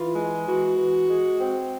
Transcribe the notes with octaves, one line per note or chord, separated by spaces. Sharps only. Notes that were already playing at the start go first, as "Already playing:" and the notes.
Already playing: E3 F4
G#3
E3 F#4
E3
G#3
C4